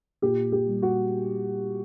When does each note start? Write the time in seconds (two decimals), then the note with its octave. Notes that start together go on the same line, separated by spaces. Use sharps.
0.22 A#2 G4
0.52 G4
0.67 G3
0.82 F#4